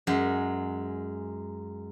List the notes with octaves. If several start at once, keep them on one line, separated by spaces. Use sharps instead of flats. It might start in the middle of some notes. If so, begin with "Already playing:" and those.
F#2 G#3